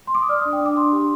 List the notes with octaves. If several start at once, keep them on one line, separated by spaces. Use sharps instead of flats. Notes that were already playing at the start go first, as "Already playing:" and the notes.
C6
D6
D#6
D5 F6
D4 D#6
G5
D4 D6
D4 C6
G4